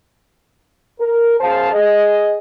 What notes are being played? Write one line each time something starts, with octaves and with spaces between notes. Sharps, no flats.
A#4
F#2 G#4 C5 F5 A5
G#4 D#5